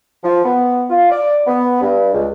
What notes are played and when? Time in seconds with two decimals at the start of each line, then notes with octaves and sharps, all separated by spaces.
0.24 F3
0.45 B3
0.89 F4
1.10 D5
1.47 B3
1.81 G2
2.12 C#2